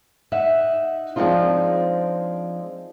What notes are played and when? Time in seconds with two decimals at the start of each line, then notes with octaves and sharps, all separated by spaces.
0.32 D#4 E5 F#5
1.16 F3 G#3 C4 D4 D#4 F4